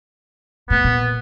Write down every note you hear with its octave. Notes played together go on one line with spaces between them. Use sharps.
A2 B3
A#2